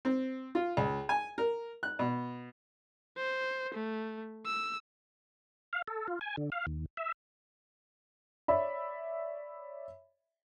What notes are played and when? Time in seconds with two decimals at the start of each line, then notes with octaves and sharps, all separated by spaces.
0.05 C4
0.55 F4
0.77 C#2
1.09 G#5
1.38 A#4
1.83 F#6
1.99 B2
3.17 C5
3.74 A3
4.46 E6
5.73 F5
5.88 A4
6.08 F4
6.21 G#5
6.37 D3
6.52 F5
6.67 D#2
6.97 E5
8.48 C#5 D5 E5 B5